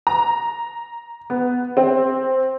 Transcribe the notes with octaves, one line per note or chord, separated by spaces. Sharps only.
A#5
B3
C4